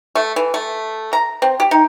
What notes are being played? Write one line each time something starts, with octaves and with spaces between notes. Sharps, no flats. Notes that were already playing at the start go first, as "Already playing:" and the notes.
A3
E3
A3
A#5
C4
G4
D#4